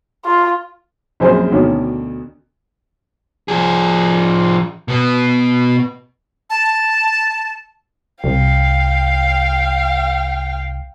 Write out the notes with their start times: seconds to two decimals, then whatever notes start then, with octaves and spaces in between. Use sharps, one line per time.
0.25 F4
1.20 A#1 F#2 C4 G#4 C5 G#5
1.52 D2 B2 D3 D#3 C#4
3.48 F3 G#4
4.88 B2 B3
6.50 A5
8.24 C2 F5 G5